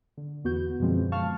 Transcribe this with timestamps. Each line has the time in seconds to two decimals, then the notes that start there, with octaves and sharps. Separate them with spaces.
0.17 D3
0.44 E2 B3 F#4 G6
0.80 F#2 B2 D3 F3 G#3 C4
1.12 F5 A5 C#6 F6